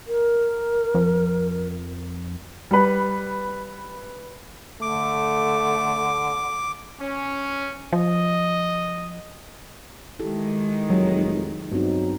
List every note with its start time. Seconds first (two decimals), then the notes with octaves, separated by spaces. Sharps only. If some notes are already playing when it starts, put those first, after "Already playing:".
0.07 A#4
0.94 F2
2.71 G3 B4
4.82 D3 A3 D6
7.01 C#4
7.93 F3 D#5
10.19 D#3 G#3 E4 G4 A4
10.90 F1 F#3 D#4 G#4
11.72 G2 F#3 B3 C4 D#4